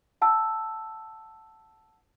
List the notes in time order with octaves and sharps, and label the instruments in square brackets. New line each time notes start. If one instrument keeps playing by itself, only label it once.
[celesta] F#5 A5 E6